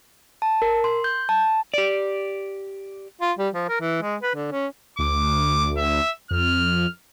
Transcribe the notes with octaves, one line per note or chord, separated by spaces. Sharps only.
A5
A#4
C6
G6
A5
G4 D5
F4
G3
F3
A#4
E3
G#3
B4
D3
C#4
D2 D6
E5
F2 F6